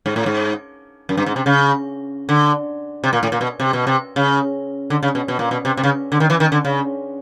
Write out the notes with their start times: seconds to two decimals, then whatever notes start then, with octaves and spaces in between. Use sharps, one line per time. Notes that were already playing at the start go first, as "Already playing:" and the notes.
0.06 G#2
0.16 A2
0.26 G#2
1.09 F#2
1.17 G2
1.26 G#2
1.36 C3
1.46 C#3
2.29 D3
3.04 C3
3.13 A#2
3.23 A2
3.32 A#2
3.41 B2
3.60 C3
3.73 B2
3.87 C3
4.16 C#3
4.90 D3
5.03 C#3
5.15 B2
5.28 B2
5.39 A#2
5.51 B2
5.65 C3
5.77 C3
5.84 C#3
6.12 D3
6.20 D#3
6.30 E3
6.40 D#3
6.52 D3
6.65 C#3